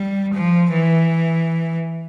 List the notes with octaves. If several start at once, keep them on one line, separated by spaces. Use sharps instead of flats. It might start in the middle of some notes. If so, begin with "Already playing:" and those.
Already playing: G3
F3
E3